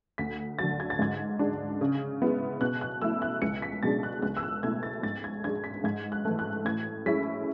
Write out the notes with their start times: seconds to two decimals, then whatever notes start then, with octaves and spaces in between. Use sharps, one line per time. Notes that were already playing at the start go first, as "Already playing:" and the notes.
0.18 D2 B6
0.59 D3 F#3 A6
0.80 G#6
0.90 A6
0.99 G#2 G#6
1.39 G#3 D4
1.81 C#3
2.21 G#3 B3 E4
2.61 B2 F#6
2.81 F#6
3.02 A3 E4 E6
3.22 F#6
3.42 C#2 C#7
3.62 B6
3.83 B2 G#3 D4 A6
4.03 F#6
4.22 C#2 F#6
4.37 E6
4.43 F#6
4.63 B2 A3 E4 G#6
4.83 A6
5.03 G#2 A6
5.24 G#6
5.44 G#3 D4 G#6
5.64 B6
5.84 G#2 G#6
6.12 F#6
6.25 E3 A3
6.39 F#6
6.65 A2 G#6
7.06 G#3 C#4 E4 B6